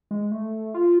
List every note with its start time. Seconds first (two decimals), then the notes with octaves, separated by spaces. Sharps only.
0.11 G#3
0.32 A3
0.74 F4